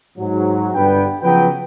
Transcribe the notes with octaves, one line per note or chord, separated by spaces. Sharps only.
G#2 F#3
G1 G2 B3 B4 G5
C#3 F3 F#3 B3 B4 G5